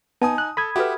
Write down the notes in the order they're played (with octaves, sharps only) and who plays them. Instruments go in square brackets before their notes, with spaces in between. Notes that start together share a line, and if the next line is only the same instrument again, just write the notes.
[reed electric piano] B3 [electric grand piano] D#4 G#5 D#6 [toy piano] A5
[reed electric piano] F#6
[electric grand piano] A4 [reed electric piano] B5 D#6 G#6
[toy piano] F#4 A4 B4 [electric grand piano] G4 E5 F#5